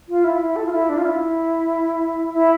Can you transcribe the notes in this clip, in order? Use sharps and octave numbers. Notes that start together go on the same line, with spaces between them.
F4
E4
E4
A4
F4
E4
D4
F4
E4
E4